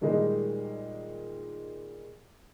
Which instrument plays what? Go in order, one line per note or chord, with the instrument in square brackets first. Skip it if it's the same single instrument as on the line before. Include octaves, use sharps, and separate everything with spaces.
[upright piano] A#2 D#3 G3 G#3 D#4 G#4